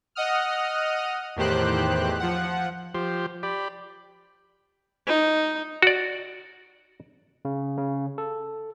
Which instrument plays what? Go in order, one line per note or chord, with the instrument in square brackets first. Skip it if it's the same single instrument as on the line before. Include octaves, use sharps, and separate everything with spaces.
[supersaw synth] D#5 F#5 D#6 F6
E2 A2 D#3 G4 C5 F#6
F3 F#5
[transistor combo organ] F3 G4 C5
G4 D5 B5
[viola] D#4
[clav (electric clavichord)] F#4 D5
[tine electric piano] C#3
C#3
A4